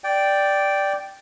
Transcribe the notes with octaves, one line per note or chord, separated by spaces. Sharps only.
D5 G5